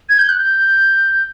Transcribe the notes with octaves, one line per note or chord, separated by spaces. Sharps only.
G#6
G6
F#6
G6